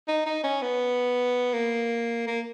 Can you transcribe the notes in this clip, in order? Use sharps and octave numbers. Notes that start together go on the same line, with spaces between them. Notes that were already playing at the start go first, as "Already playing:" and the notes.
D#4
D#4
C#4
B3
A#3
A#3